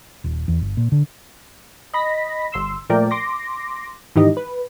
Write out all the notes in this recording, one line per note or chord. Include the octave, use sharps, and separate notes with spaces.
D#1
E2
G1
A#2
D3
D#5 B5 A#6 B6
G1 C6 E6
A#2 F3 A3 A#4 D5 G5
C6 D6 A#6
G#2 D#3 E3 D#4 G4 D#5
B4